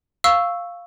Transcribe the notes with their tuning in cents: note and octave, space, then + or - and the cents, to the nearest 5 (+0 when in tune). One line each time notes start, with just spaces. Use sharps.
F5 +0 C#6 +0 E6 +0